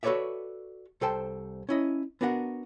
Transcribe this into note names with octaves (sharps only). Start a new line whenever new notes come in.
F#4 A4 B4 C#5 D5 E5
C2 A4 C5 G5 A5
C#4 E4 D#5
B3 D4 F#4 A#4 E5 F#5